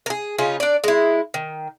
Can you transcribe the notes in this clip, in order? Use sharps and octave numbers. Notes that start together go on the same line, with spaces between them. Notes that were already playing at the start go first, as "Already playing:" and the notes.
G#4 A#4
C#3 C#4 D#4 F4
D4 D5
G#3 E4
D#3